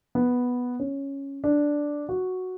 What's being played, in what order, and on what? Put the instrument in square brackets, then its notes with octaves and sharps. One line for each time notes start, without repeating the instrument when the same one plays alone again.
[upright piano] B3
C#4
D4
F#4